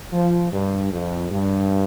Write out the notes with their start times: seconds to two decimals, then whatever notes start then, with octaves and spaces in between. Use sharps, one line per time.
0.13 F3
0.52 G2
0.91 F2
1.30 G2